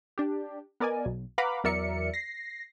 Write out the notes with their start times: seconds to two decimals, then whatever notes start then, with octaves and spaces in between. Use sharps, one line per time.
0.18 D4 G4
0.80 B3 A#4 D5 D#5 G#5
1.06 B1
1.38 B4 F5 F#5 A#5 B5 D6
1.64 E2 F#3 A#4 D5 E5 C#7
2.14 A#6 C7